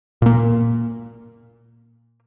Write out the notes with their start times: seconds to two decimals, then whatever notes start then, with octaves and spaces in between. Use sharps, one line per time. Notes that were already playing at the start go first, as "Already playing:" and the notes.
0.22 A#2 A#3